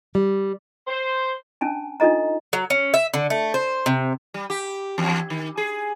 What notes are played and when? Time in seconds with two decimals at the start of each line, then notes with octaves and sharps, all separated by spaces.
0.15 G3
0.87 C5
1.61 C#4 D4 G#5 A5
2.00 D4 D#4 F4 A4 D#5 A#5
2.53 F#3
2.70 C#4
2.94 E5
3.14 D3
3.30 A3
3.54 C5
3.86 C3
4.34 G3
4.50 G4
4.98 E2
5.30 D#3
5.57 G#4